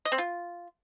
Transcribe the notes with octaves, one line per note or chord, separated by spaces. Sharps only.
D#5
C4
F4